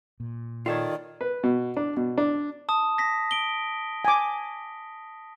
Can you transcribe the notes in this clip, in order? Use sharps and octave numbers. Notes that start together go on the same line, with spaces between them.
A#2
D#3 F4 A4 C#5 D5
B4
B2
D4
B2
D4
A5 D#6
A#6 B6
D7 G7
G#5 D6